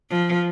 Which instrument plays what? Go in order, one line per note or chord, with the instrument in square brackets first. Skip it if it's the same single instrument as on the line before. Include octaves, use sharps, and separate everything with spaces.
[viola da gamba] F3